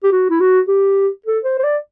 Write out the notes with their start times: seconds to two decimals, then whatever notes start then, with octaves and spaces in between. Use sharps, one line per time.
0.04 G4
0.12 F#4
0.30 E4
0.41 F#4
0.68 G4
1.26 A4
1.44 C5
1.59 C5
1.64 D5